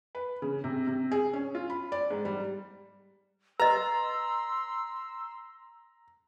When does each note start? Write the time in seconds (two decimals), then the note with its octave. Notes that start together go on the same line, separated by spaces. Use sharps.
0.15 B4
0.42 C#3
0.64 C3
0.87 C3
1.11 G#4
1.33 C#4
1.55 F4
1.70 B5
1.92 D5
2.11 G#2
2.25 G3
3.60 B4 D#5 A#5 C6 E6